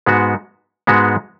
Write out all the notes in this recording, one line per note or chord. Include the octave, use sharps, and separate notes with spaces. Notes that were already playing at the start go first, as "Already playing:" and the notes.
G#2 G#3 B3 F#4
G#2 G#3 B3 F#4